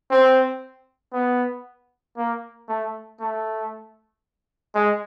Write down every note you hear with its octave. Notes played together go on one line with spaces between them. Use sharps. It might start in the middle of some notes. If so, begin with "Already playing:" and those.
C4
B3
A#3
A3
A3
G#3